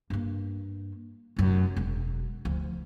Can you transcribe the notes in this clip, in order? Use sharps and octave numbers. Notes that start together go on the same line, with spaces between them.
G2 A#3
F1 F#2
E1
D2 F3